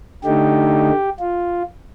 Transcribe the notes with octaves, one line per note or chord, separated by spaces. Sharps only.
D3 A3 D#4 G4
F4